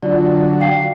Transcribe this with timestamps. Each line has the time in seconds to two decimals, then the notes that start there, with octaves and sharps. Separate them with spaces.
0.03 D3 F#3 F4 D5
0.60 F5 G5 C7